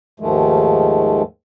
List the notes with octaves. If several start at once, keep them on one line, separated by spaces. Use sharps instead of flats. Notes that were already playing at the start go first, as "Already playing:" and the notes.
D#2 G#2 D#3 F3 G#3 A3